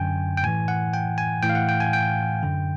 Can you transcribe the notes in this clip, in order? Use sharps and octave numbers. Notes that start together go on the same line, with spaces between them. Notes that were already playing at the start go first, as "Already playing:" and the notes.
Already playing: F#2 D3 G5 G#5
G5
A2 E3 G#5
F#5
G5
G#5
A2 E3 G5
F5
F#5
G5
G#5
G5
F#2 D3